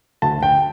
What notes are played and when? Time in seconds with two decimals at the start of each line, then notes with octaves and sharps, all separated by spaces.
0.22 D2 A5
0.43 G5